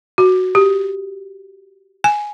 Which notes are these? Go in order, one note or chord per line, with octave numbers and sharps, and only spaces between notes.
F#4
G4
G#5